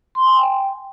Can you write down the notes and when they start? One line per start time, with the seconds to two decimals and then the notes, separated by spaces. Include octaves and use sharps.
0.15 C6
0.26 G#5
0.37 G5